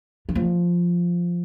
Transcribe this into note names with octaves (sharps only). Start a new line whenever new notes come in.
E3
F3